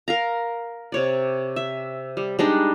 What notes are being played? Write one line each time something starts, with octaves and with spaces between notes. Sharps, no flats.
A#4 F5 A#5
C3 C#5 D5
E5
G3
G3 G#3 D4 D#4